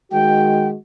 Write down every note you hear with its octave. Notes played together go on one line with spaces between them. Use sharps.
D#3 G#3 F#4 G5